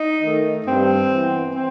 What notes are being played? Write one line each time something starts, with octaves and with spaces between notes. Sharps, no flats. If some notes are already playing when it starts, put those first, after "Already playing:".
Already playing: D#4
D#3 A3
G2 C4
E3 B3
C4